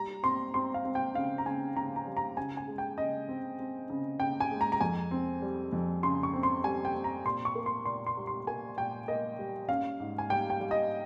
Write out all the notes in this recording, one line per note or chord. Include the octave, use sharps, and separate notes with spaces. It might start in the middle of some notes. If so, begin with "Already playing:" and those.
Already playing: G3 A#5
C4 C6
C4 C6
F5
C4
G5
C#3 F5
A#5
C#3 G#5
C#3 A#5
A#5
G3
A#5
C#3 G#5
G#5
G#3
G5
C#3 D#5
C4
C4
C#3
C#3 G5
G#5
G#3
A#5
A#5
F2 G#5
C4
G3
F2
C#3 C6
C#6
C4
C6
G3 G#5
G5
C4
A#5
A#2 C6
C#6
A#3
C6
A#2 C6
C6
G3
C6
A#3 G#5
A#2 G5
A#3 D#5
G3
C#4 F5
G#2
G#5
G3 G5
G5
G3
D#5